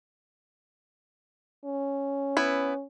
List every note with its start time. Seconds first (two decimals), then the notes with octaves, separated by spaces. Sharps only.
1.65 C#4
2.37 B3 E4